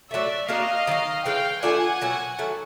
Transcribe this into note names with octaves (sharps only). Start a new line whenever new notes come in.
A2 F#3 A3 D5 E5
A#3 D4 F#4 A#4 D#5 F5
D#3 F#3 A#3
E3 G#3 C#4 F5 G5
E3 A3 D4 F4 F#5 G#5
B2 F#3 A#3
D#3 F#3 A3